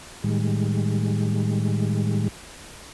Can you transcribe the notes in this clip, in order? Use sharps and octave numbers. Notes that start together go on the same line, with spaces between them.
A2 D#3 G3 G#3